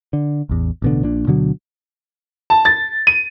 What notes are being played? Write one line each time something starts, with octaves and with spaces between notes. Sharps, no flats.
D3
A1 E2
A1 B2 D3
A#1 A#2 D4
D2 B2 D3 F#3
A5
A6
D#7